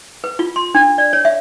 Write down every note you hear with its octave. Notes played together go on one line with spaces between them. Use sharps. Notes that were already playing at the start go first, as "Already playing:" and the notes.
B4
F4
C6
D4
D5
C#5
E5